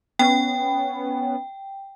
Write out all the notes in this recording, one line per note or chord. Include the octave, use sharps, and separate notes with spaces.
B3 C#4 G5